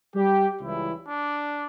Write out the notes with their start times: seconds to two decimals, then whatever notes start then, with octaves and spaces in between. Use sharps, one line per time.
0.15 G3 G4
0.61 C#2 C#3 E3 G3 E4
1.07 D4